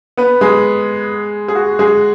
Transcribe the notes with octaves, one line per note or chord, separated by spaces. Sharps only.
B3 B4
G#3 G#4
G#4
F#4
G#3 G#4